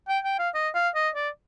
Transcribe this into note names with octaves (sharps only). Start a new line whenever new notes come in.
G5
G5
F5
D#5
F5
D#5
D5